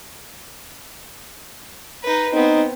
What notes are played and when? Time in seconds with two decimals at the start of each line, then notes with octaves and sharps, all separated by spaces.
2.03 D#4 B4
2.33 B3 C4 D#4